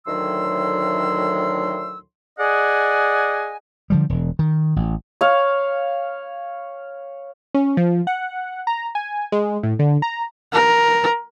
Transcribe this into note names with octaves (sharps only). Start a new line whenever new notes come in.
D2 A2 D#3 F#3 C6 E6
G#4 D5 D#5 F#5 G#5
D3 F3 G3
E1
D#3
A1
C#5 F5
C#4
F3
F#5
A#5
G#5
G#3
A2
D3
A#5
A#4